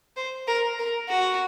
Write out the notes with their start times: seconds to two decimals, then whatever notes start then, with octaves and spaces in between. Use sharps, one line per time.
0.16 C5
0.47 A#4
0.79 A#4
1.09 F#4